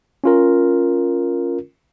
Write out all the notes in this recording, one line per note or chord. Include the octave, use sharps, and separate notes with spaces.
C#4 F4 A#4